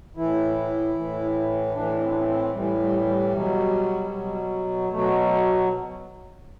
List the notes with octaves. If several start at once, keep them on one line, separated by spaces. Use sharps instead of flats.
A2 E3 E4
A2 E3
A2 E3 D4
C4
D4
C4
C4
A2 E3 G3
G3
G3
B2 F#3
B2 F#3
B2 F#3 A3